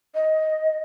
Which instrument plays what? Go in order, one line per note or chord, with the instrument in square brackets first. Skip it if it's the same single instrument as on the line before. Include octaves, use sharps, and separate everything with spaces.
[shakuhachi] D#5